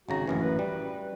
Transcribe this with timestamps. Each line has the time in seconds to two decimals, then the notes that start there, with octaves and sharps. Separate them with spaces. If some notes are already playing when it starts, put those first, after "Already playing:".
0.09 G#1 C#3 F#4 A#5
0.28 A1 F#2 E3 C#4
0.41 B4
0.59 G3